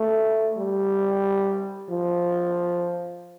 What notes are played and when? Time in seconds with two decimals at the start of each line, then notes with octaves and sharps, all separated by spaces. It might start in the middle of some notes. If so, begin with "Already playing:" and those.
Already playing: A3
0.57 G3
1.90 F3